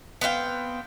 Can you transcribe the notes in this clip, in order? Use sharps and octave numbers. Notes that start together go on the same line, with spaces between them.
B3 C4 F5 G5